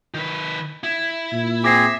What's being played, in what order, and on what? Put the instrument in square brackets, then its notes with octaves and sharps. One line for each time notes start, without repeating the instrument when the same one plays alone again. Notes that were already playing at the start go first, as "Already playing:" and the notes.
[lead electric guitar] D#3 B4
E4
[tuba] A#2
[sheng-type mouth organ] C4 G#4 [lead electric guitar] E5 [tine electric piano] D6 A#6 C7